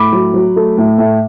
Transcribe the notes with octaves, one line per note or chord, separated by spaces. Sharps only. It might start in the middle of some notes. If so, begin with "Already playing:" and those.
Already playing: A2 B5 D6
F#3
F#3
A3
A2
A2